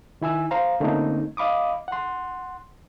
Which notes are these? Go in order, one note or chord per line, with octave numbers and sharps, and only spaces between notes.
D#3 E4 G#5 E6
C5 F5 A#5
D3 A3 A#3 C4 C#4 D#4
D#5 F5 B5 D6 D#6
F#5 C6